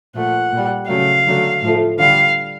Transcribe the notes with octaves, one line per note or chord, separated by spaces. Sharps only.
A#2 F3 A3 F#5
A#2 G3
C#3 F#3 A3 F5
D3 F#3 A3
A2 F3 A3
D3 G3 F5